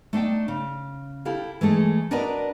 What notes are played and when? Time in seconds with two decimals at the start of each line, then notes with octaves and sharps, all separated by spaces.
0.13 A3 D4 D#4 G5
0.48 C#3
1.25 E4 G4 A4 F5
1.61 E3 G#3 A3 A4
2.11 D4 F#4 A#4 B4 D5 D#5